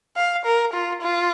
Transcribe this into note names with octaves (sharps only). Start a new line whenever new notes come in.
F5
A#4
F4
F4